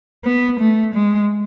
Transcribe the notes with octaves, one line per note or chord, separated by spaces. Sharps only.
B3
A3
G#3